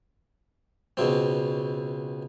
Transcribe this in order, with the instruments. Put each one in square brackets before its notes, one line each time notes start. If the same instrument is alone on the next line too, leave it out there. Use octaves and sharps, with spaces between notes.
[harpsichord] C#2 B2 C4